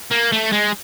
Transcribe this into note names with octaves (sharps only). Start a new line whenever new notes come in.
A#3
A3
G#3